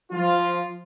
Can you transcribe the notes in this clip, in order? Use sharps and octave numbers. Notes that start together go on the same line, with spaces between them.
F3 F4